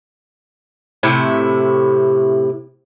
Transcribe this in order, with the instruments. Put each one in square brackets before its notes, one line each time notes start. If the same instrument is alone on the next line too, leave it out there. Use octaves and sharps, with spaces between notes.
[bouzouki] A2 C3 E4